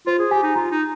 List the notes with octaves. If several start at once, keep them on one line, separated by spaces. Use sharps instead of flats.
F4 C5
G#4
G4 G#5
D#4
F4 A#5
D#4